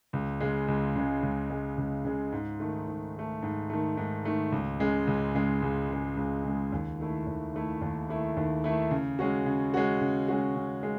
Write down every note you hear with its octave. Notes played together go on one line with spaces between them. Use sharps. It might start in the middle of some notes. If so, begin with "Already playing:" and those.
C#2
C#3 G#3
C#2
C#3 G#3
C#2
C#3 G#3
C#2
C#3 G#3
G#2
D#3 A3
G#2
D#3 A3
G#2
D#3 A3
G#2
D#3 A3
C#2
C#3 G#3
C#2
C#3 G#3
C#2
C#3 G#3
C#2
C#3 G#3
D#2
D#3 A3 E4
D#2
D#3 A3 E4
D#2
D#3 A3 E4
D#2
D#3 A3 E4
C#3
G#3 C#4 F#4
C#3
G#3 C#4 F#4
C#3
G#3 C#4 F#4
C#3
G#3